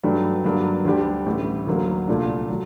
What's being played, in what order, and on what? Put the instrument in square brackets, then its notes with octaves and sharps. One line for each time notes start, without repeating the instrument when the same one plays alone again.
[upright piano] G2 F#3 A3 D4 G4
G2 D3 F#3 A#3 D4
D2 D3 G3 D4 G4
A1 A2 G3
D2 D3 F#3 A#3
C2 A#2 A3 D4
F#3 A3